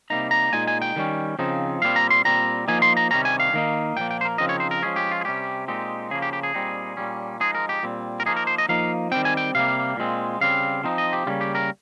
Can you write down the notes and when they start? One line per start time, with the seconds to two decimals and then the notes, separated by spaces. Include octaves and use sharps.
0.10 C3 G3 A#3 D#4 A#5
0.31 A#5
0.53 A#2 G#3 D#4 G#5
0.67 G#5
0.82 G5
0.96 D#3 G3 C#4
1.39 C#3 F3 C4 D#4
1.82 A#2 G3 C4 F5
1.96 A#5
2.10 C6
2.25 A#2 G3 C4 A#5
2.68 F3 A#3 D#4 G#5
2.82 C6
2.97 A#5
3.11 C3 D#3 G3 C#4 A#5
3.25 G#5
3.40 F5
3.53 D#3 A#3 D#4
3.96 A#2 F3 A#3 G5
4.11 G5
4.21 C5
4.25 A#4
4.38 C#3 F3 C4 D#4 D#5
4.49 C#5
4.60 C5
4.71 A#4
4.82 F3 G#3 C#4 G#4
4.96 G4
5.11 F4
5.21 G#4
5.25 C3 G3 C#4 G4
5.68 A#2 G#3 C4 D#4 G4
6.11 C#3 F3 A#3 G#4
6.22 G4
6.33 G4
6.43 G#4
6.54 A#2 G3 C4 D#4
6.97 A#2 G3 C#4
7.40 F3 G#3 D#4 G#4
7.55 A#4
7.69 G4
7.83 A#2 G3 C4
8.20 A#4
8.26 F3 A#3 D#4 G#4
8.36 A#4
8.47 C5
8.58 D#5
8.69 F3 A#3 D#4 F5
9.12 D#3 G3 C4 G5
9.25 G#5
9.37 G5
9.55 C3 G3 A#3 F5
9.97 A#2 G#3 C4
10.41 C#3 G3 C4 F5
10.84 F3 C4 D#4
10.98 D#5
11.13 G4
11.26 C#3 G3 A#3 C#4 F4
11.41 G4
11.55 A#4